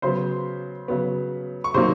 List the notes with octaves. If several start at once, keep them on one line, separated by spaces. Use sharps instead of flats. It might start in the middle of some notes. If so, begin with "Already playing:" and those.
C#3 F#3 B3 C5 C6
C#3 F#3 B3
C#6
C3 D#3 F#3 A#3 C5 C6